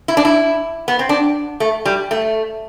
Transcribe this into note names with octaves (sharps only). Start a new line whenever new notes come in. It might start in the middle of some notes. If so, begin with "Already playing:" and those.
E4
D4
E4
B3
C4
D4
A3
G3
A3